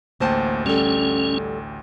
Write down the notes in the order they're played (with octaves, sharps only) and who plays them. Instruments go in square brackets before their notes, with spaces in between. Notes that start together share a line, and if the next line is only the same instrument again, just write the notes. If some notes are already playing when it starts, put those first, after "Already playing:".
[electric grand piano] A1 D2 G5 [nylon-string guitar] A#3 C5 A5
[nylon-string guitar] G3 A4 [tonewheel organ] C#4